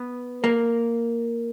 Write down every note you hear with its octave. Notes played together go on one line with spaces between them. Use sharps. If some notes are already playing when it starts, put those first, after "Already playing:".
Already playing: B3
A#3